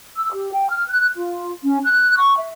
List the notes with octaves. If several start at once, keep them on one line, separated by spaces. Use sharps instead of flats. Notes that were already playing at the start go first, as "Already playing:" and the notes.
E6
G4
G5
F6
F#6
F4
C#4
F#6
C#6
E5